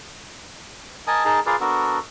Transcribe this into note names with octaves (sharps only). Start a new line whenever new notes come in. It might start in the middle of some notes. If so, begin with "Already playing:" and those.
A#4 D#5 G#5 A5 D#6
D#4 G#4 A#4 A5 A#5
F4 G#4 A#4 B4 D5 F5
B3 D4 F#4 A4 A#4